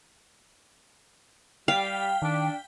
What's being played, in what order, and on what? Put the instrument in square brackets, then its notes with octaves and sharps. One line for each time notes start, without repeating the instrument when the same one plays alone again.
[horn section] G3 [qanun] F5 [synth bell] G5 B6
[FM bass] D#3 [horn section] D4